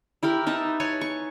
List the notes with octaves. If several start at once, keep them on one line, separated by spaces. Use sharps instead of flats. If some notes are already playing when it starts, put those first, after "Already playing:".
E4 G4 A#4 B5
D#4 B4 E5 A5
B4 C#5 G#5 A5
C#6